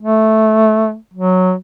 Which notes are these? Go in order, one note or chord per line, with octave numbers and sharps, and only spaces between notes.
A3
F#3